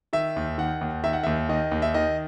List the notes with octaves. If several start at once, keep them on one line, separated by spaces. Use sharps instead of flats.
D#3 E5
D#2
D#3 F#5
D#2
D#3 E5
F#5
D#2 E5
D#3 D#5
D#2
E5
D#3 D#5